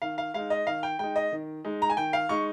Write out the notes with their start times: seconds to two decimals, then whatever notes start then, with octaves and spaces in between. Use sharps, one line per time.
0.02 D#3 F5
0.18 F5
0.34 G#3 D#4 F5
0.50 D#5
0.67 D#3 F5
0.83 G5
0.99 G#3 D#4 G5
1.16 D#5
1.32 D#3
1.65 G#3 D#4
1.82 A#5
1.90 G#5
1.97 D#3 G5
2.13 F5
2.29 G#3 D#4 C#6